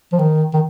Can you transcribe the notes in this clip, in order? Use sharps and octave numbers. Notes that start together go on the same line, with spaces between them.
F3
D#3
D#3